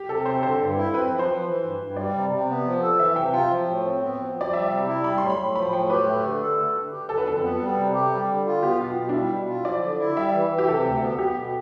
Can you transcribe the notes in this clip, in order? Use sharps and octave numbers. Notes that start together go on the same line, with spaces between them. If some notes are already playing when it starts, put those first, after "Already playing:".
Already playing: G4
C3 A4
C4 C5
D3 C5
G2
E4
C4 B4
F3
C5
F3
E3
G2
G2
G3 D5
C3
C3
B3
F3
A4
E3 E5
C3 G5
F4 G5
F3
A2
C4
B3
F3
F3
D5
G3 E5
C3
E4
G3 B5
A2 C6
B5
A2
F3 B5
A2 G5
G4 B4
A3
D3
A4
A3
D3
G4
D3 A4
B4
F2 A4
B3
G3
C3
G4
G3
D3
F4
B3 G4
B2 F4
B2
D4
G3 E4
B2
F4
F3 D5
D3
E4
G3 E5
E3
E3
G4
C3 A4
D2
B3
B3 G4
B2